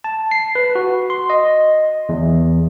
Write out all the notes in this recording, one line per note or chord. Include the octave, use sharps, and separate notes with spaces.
A5
C7
B4
F#4
C6
D#5
E2